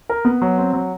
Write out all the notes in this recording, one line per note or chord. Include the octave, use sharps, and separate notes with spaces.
A#4
B3
F#3
C4
F#3